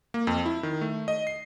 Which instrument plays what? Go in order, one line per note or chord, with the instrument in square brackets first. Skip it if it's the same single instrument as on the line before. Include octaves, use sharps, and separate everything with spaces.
[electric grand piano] A#3
F2
E4
D#3
A3
D#5
C7